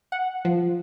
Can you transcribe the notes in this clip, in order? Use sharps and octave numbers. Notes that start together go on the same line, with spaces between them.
F#5
F3